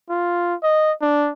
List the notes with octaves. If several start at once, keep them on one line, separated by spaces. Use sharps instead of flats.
F4
D#5
D4